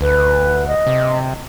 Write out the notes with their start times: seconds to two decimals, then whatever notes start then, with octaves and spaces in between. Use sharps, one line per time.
0.01 D2 B4
0.68 D#5
0.87 C3